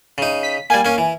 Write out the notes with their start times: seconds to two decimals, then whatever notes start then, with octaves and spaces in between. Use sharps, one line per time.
0.18 C#3 D#4
0.43 B6
0.70 G3 A#3 G#5
0.85 A#3 C#4
0.98 E3